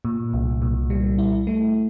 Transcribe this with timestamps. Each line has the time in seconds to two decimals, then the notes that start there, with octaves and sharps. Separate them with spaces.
0.05 A#2
0.34 C2
0.62 A#2
0.90 G3
1.18 E4
1.47 A3